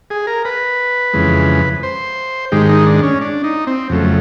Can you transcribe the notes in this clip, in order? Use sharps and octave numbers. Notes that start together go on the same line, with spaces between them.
G#4
A#4
B4
F2 C#3 E3 G#3
C5
G#2 D#3 G#3 G4
D#4
D4
C#4
D4
D#4
C4
F2 C#3 F#3 A3